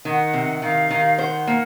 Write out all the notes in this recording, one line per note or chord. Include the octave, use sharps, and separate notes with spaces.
D#3 F#5
C3
D#3 F5
D#3
C5 F#5
A#3